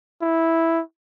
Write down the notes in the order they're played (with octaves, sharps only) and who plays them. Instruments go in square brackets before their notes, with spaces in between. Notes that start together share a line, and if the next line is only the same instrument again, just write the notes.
[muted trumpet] E4